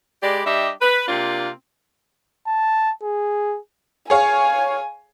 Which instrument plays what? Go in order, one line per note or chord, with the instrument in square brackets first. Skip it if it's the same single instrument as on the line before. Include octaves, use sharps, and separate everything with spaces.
[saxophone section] G#3 G4 B4 D5
G3 D4 G4 D#5 E5
B4
C3 A#3 C4 D4 F4
[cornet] A5
G#4
[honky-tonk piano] G#4 C#5 F5 [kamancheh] G#5